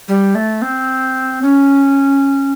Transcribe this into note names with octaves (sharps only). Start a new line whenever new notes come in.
G3
A3
C4
C#4